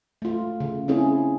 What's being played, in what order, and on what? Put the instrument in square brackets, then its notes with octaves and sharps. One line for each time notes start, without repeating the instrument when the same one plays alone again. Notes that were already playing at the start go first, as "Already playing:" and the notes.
[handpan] A3 F4
C#3
C4 C#4 E4 G#4